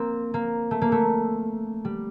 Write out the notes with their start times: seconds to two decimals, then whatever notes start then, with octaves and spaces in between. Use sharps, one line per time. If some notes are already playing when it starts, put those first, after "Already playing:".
Already playing: A#3 C4
0.34 A#3
0.71 A3
0.82 A#3
0.92 A3
1.85 G3